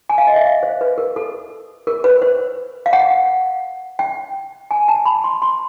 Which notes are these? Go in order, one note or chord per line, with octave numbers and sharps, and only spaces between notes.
G#5
F5
D#5
E5
F5
C5
B4
A#4
A4
A#4
B4
C5
F5
F#5
G5
G#5
A5
B5
C6
C6